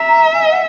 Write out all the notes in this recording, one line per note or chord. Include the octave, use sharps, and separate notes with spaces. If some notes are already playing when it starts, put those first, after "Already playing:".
Already playing: E5 A#5
G#5
F#5